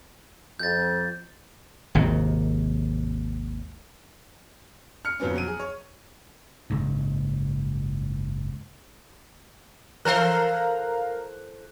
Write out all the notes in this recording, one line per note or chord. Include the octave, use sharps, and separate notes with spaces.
F2 G6 A6
G#1 D#2 C3
F6 C#7
F2 B2 F3 F#3 B3 C#4
F#3 D#7
G#4
C#5
F#1 C#2 G#2
E3 A4 A#4 C5 F5 A#5 F#6